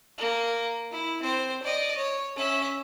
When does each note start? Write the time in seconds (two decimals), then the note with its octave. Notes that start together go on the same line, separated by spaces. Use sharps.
0.18 A#3
0.91 E4
1.22 C4 C5
1.63 D5 D#5
1.97 C#5
2.36 C#4 E5